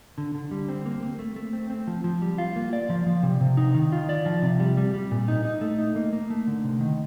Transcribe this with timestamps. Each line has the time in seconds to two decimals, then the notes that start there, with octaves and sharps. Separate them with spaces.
0.18 D3
0.35 D3
0.51 G3
0.69 C4
0.86 A#3
1.03 A#3
1.19 A3
1.36 A3
1.53 C4
1.70 C4
1.87 F3
2.04 F3
2.22 G3
2.38 F4
2.56 A#3
2.73 D5
2.90 F3
3.06 F3
3.23 C3
3.41 C3
3.57 D#4
3.75 D#3
3.92 F4
4.09 D5
4.26 F3
4.43 C3
4.60 G3
4.77 G3
4.94 G3
5.11 A#2
5.28 D#4
5.45 D#4
5.61 A3
5.79 D#4
5.96 A#3
6.13 A#3
6.30 A3
6.47 D3
6.64 C3
6.81 D#3